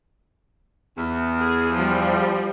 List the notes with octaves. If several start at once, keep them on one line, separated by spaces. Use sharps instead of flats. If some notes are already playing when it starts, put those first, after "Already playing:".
E2
G#4
F3 G3